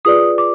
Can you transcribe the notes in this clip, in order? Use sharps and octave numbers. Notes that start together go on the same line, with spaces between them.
F4 G#4 B4 D5 D#6
D6